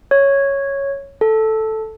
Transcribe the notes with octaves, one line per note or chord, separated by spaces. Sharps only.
C#5
A4